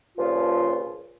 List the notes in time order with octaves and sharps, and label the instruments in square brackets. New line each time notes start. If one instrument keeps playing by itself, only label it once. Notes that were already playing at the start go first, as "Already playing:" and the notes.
[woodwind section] G2 A#2 C#3 F3 F4